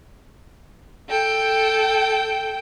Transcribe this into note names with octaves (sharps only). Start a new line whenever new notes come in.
A4 G5